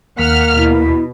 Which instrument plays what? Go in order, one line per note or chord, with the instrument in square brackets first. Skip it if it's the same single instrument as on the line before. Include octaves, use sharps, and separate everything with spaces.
[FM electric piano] D#2 B6 [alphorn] A#3 [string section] F#5 F6
[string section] B2 [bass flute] E4